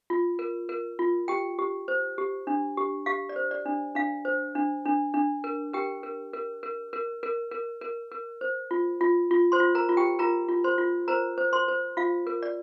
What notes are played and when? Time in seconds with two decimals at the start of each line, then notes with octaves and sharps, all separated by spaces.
0.10 F4
0.39 A#4
0.69 A#4
0.99 F4
1.28 G4 G5
1.59 G4
1.88 C5
2.18 G4
2.47 D4
2.77 G4
3.06 G4 F5
3.29 D5
3.36 C5
3.51 D5
3.66 D4
3.95 D4 F5
4.25 C5
4.55 D4
4.85 D4
5.14 D4
5.44 A#4
5.73 G4 A#4 G5
6.03 A#4
6.33 A#4
6.63 A#4
6.93 A#4
7.23 A#4
7.51 A#4
7.81 A#4
8.12 A#4
8.41 C5
8.71 F4
9.01 F4
9.31 F4
9.52 C5 C6
9.60 F4
9.75 A#4 A#5
9.89 F4
9.97 G4 G5
10.19 F4 A#4 A#5
10.49 F4
10.64 C5 C6
10.78 F4
11.08 A#4 C5 A#5
11.38 C5
11.53 C5 C6
11.68 C5
11.97 F4 F5
12.27 A#4
12.43 D5